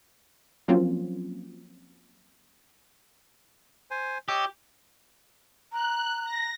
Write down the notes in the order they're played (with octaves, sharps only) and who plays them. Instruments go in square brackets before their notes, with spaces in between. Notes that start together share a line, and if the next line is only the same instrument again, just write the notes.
[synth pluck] F3 F#3 A#3 C4 C#4 F4
[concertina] C5 G#5
[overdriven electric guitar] G4 [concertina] C#5 D#5 E6
[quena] A#5 [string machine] F#6
[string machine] A#6